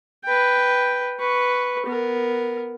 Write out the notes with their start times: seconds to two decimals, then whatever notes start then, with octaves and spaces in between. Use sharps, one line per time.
0.24 B4 G5
1.19 B4 C#6
1.86 B3 A#4